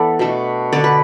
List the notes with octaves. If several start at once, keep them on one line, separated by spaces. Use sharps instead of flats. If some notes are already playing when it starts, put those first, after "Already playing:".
Already playing: E3 B3 A4 D5 E5
B2 A3 D4
D3 B3 D4 D5
B4